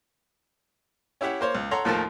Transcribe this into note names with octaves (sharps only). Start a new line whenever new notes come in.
C#4 E4 G4 E5 F#5
A#3 C5 C#5
C#2
A4 C#5 F#5 A#5 C6
D#2 A2 F3 A#4 A5 F6